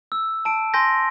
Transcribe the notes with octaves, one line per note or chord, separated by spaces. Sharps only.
E6
A5 D7
G#5 C6 G6 A#6